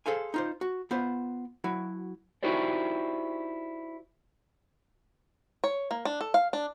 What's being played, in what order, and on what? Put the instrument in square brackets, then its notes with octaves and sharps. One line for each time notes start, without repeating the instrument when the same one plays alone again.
[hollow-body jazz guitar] G#4 A4 C5 F5 G#5
D#4 F4 C5
F#4
B3 F4 C5 F#5
F#3 E4 F#4
[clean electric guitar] D#4 E4 F#4 G4 C5 D5
[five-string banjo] C#5
A#3
D4
A4
F5
D4